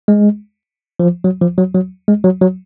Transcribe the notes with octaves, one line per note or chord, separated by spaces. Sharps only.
G#3
F3
F#3
F3
F#3
F#3
G#3
F#3
F#3